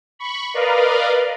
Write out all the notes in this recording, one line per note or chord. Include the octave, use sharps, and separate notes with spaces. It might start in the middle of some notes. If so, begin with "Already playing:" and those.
B5 C#6
A#4 B4 D5 D#5 F5